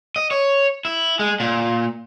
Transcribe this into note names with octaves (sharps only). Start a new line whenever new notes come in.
D#5
C#5
E4
G#3
A#2